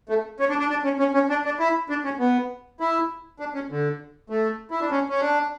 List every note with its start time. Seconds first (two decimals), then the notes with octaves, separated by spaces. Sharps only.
0.09 A3
0.40 C#4
0.49 D4
0.59 D4
0.70 D4
0.84 C#4
0.99 C#4
1.14 C#4
1.30 D4
1.45 D4
1.60 E4
1.89 D4
2.05 C#4
2.19 B3
2.80 E4
3.40 D4
3.54 C#4
3.70 D3
4.30 A3
4.71 E4
4.81 D4
4.90 C#4
5.09 C#4
5.21 D4